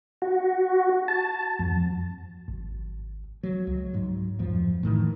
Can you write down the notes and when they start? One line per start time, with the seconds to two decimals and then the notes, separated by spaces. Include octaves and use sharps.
0.22 F#4
1.08 A5
1.59 F2
2.48 G#1
3.43 F#3
3.67 C#2
3.93 G#2 F#3
4.39 D1 F2 F3
4.83 A2 D#3 E3